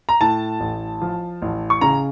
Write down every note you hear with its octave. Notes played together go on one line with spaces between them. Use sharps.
A#5
A2 A5
A1
F3
A1
C#6
C#3 A#5